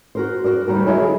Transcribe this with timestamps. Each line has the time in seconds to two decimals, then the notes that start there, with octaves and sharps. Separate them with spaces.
0.15 F#4 A#4 C5
0.44 F#4 G#4 A#4 D5
0.67 D2 G3 D#4 F#4 A#4
0.86 F#3 G#3 E4 A#4 C#5 E5
1.00 D3 G#4